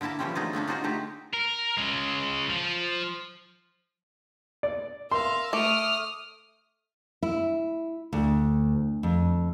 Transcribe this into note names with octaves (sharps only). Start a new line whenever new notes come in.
D3 A#3 E4 A#4 A5
C#3 E3 F3 G3 C4 C#4
D3 A3 D#4 F4 G#4
A3 A#3 C#4 D4
D4 D#4 F4 F#4 G#4 C5
D3 A3 D#4 G4
A#4
C#3 G#3
F3
D5
A#4 E5 F5 C6
A3 D6 D#6 F6
E4
D2
F2